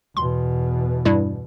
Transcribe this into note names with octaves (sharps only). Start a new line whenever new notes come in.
E2 B2 C6
G2 G3 E4